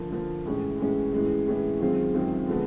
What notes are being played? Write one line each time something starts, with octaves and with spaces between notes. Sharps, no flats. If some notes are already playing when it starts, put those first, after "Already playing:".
Already playing: D3 F3 A#3
D3 F3 A#3
A2 E3 G#3 C#4
A2 E3 G#3 C#4
A2 E3 G#3 C#4
A2 E3 G#3 C#4
F#2 D#3 G#3 C4 F4
F#2 D#3 G#3 C4 F4
D3 F3 G#3 B3